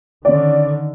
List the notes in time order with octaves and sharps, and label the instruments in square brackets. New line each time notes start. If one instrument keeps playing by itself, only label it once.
[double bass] D3 D#3 [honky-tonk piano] C#4 D5